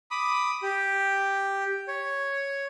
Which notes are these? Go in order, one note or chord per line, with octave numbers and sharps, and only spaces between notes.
B5 D6 D#6
G4
C#5